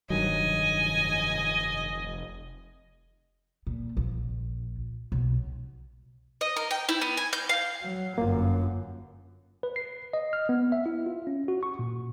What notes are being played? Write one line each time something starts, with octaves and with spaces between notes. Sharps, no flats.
F1 G2 D#3 F#3 D#5 G#5
A#2
A#1
B1
D#5
A#4
G5
E4
B3
G#5
G6
F5
F#3
G1 F#2 A#3 F4
B4
C7
D#5
F6
B3
E5
E4
F4
C#4
F#4
C#6
A#2